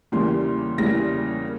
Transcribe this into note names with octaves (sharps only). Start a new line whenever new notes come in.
E2 C#3 E3 G3 A#3 C6
E2 C#3 E3 G3 A#3 A#6
A#3